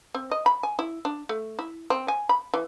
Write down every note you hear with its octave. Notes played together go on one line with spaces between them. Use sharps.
C4
D#5
B5
G#5
E4
D4
A3
E4
C4
G#5
B5
E3